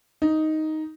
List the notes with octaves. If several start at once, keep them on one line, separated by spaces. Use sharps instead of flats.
D#4